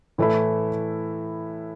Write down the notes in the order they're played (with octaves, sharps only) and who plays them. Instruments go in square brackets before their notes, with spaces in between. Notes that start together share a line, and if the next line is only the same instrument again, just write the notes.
[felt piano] A2 E3 A3 E4